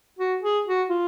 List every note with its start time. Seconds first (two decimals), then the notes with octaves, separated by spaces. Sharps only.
0.19 F#4
0.43 G#4
0.67 F#4
0.90 F4